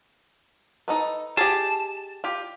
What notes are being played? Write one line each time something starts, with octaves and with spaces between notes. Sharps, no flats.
D#4 A4 B4
G4 G#4 A5
F4 G4